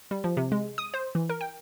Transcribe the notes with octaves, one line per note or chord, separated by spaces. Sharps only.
G3
F3
C3
G#3
D#6
C5
E3
A#4
G5